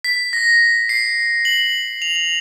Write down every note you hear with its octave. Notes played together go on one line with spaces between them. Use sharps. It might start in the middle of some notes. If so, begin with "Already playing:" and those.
B6
A#6
C7
F#7
F7
F7